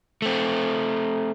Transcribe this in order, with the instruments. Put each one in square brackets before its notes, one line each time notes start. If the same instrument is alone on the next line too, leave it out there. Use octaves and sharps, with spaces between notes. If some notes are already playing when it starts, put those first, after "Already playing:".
[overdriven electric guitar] A3 C4